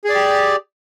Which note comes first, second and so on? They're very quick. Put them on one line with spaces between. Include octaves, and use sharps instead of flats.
G#4 D5 G4